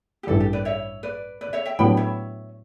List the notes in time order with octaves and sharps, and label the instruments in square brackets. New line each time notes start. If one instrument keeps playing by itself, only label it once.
[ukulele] G4
[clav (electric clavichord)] A1 G2 E3 G3 [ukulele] A4
[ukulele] G4
B4 D5
C#5 E5
B4 D5
B4 D5
C#5 E5
E5 G5
[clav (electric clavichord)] A2 F#3 B3 D4 G4 [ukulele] G5 B5
[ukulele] C#5 E5